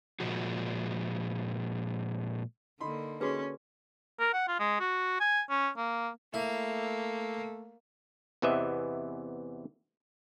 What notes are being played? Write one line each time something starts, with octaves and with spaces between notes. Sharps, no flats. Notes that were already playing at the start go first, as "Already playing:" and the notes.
A#2 F3 G#3 F#4
D3 A#3 D#4 B5 C6
C#4 F#4 G#4 B4
A#4
F#5
F4
G#3
F#4
G#5
C#4
A#3
A3 A#3 E4
E2 C3 E3 B3 D#5 E5